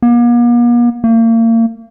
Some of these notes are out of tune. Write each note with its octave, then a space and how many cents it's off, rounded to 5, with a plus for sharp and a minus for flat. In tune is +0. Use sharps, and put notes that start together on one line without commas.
A#3 +45
A#3 -35